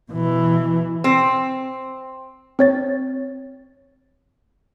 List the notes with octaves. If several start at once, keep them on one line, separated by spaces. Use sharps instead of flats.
B2 E3
C4
C4 C#5 A6